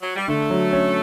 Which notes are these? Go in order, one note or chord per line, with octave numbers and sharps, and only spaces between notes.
F#3
G3
D3 A3
F#3
C#4